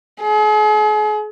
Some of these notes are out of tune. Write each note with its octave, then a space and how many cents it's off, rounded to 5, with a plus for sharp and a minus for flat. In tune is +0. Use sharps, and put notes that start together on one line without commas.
G#4 +40